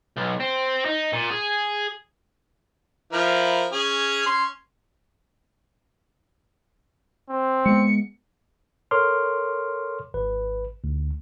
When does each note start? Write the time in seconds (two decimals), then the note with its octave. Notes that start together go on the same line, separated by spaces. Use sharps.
0.17 B1
0.40 C4
0.85 D#4
1.13 A#2
1.30 G#4
3.13 F3 E4 A#4
3.72 C#4 G#4
4.26 C#4 C6
7.30 C4
7.66 G#3 A3 B3 C#7
8.91 A4 A#4 C#5 C6 D6 F6
10.14 G#1 B4
10.84 D2